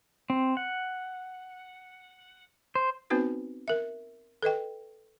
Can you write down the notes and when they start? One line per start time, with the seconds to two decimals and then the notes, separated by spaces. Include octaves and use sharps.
0.30 C4
0.57 F#5
2.75 C5
3.10 B3 C4 D#4 F#4 B4 C5
3.68 A#4 E5
4.42 A4 B4 D#5 G5